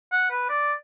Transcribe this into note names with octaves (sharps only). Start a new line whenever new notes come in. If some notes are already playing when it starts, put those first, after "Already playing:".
F#5
B4
D5